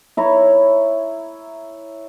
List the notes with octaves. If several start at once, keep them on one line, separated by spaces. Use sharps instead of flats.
E4 C#5 A#5